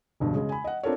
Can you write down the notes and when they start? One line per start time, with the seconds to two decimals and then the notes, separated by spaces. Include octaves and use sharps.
0.20 E1 D2 G2 B2
0.34 C#3 G#3
0.49 G#5 B5
0.64 D#5 F#5
0.83 C4 D4 F4 A4 A#4 C#5